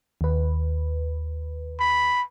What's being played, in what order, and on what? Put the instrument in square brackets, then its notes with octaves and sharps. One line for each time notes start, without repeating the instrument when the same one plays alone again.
[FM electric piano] D#2 B4
[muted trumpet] B5